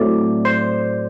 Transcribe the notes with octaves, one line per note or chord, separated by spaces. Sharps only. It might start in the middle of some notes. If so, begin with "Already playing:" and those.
Already playing: A2 F#3 A3 C4 D5
C5